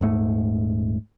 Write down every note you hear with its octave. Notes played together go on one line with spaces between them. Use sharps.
D#1 G#2 A3